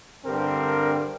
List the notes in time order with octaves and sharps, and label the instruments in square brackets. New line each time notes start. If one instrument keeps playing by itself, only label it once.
[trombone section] G2 D3 G3 C4 A#4